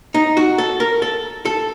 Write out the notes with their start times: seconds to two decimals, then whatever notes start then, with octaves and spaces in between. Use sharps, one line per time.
0.14 D#4
0.37 F#4
0.58 A4
0.80 A#4
1.02 A4
1.45 A4